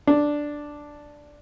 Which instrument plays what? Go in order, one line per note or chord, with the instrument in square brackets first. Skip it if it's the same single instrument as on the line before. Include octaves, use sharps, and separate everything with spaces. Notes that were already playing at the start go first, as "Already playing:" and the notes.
[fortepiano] D4